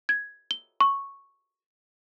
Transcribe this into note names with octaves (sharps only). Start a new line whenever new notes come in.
G#6
G7
C#6